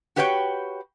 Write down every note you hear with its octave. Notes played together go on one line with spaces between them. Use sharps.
F#4 G4 B4 C#5 F5 G5